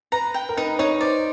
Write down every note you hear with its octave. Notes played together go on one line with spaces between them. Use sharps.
B4 A#5
G5
A#4
D#4 B4
D#4 C#5
C5 D5